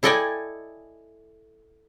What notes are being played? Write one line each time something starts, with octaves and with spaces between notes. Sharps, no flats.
E4 A4 D5 D#5 G5 G#5